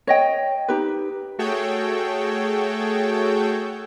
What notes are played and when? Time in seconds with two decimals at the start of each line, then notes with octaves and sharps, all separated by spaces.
0.07 C#5 D#5 G5
0.68 D#4 G4 B4
1.39 A3 F#4 G#4 A4 C#5 G5